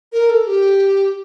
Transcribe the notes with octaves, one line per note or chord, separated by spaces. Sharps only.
A#4
A4
G4